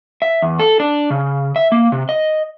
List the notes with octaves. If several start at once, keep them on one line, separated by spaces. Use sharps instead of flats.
E5
E2
A4
D4
C#3
E5
A#3
C3
D#5